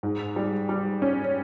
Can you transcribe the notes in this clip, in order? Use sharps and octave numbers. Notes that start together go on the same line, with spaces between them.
G#2
G3
G3
C#4